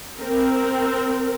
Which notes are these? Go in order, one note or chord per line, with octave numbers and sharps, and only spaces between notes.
C4 A#4